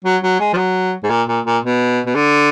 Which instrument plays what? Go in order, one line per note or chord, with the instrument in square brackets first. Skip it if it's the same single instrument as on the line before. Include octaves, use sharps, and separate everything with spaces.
[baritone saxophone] F#3
F#3
G#3
F3
F#3
G#2
A#2
A#2
A#2
B2
B2
D3